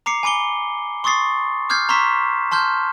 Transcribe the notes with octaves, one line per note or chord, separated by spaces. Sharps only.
A#5 D6 C7 C#7
G#5 B5 D6 C#7 G7
C6 C#6 D#6 A6 C7
D6 F6 G6 G#6 C7
A#5 C6 C#6 E6 B6 E7
A5 C6 F6 G6